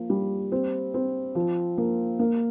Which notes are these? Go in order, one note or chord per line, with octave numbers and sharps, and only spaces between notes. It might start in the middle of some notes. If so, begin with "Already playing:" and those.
Already playing: F3 A#3
G3
C4
C4
F3
A#3
A#3